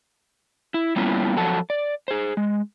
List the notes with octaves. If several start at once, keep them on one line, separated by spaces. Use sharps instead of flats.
E4
G3 A#3 B3 C#4 E4 F4
F3 F#3 A4 F#5 A5
D5
G#4 C5
G#3